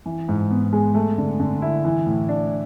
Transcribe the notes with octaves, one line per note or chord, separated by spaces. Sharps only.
E3
G#2
B3
G#3
A3
D3
D3
E4
E3
A2
D4